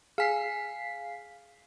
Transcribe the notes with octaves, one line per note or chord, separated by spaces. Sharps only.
G#4 F5 G#5 B6 C7